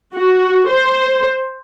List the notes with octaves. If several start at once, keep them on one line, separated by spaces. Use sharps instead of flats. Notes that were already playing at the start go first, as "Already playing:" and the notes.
F#4
C5